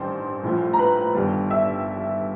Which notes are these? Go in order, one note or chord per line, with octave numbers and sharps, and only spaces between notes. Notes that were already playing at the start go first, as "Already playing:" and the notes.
Already playing: A1 G2 D#3 G3 C5
A#1 A2 F3
A#5
B4 B5
G1 G2 D#3 G3
E5 E6